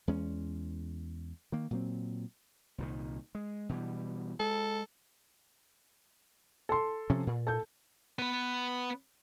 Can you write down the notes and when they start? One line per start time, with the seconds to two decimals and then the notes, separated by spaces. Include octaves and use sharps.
0.08 E2 G#3 C#4
1.52 D#3 A#3
1.71 A#2 F#3 C4
2.78 C2 A#2 D#3
3.35 G#3
3.69 B2 E3 G3
4.40 G#3 A4
6.69 A4 C6
7.10 C3 F3 C#4
7.27 A#2
7.47 A4 G6
8.19 B3 B4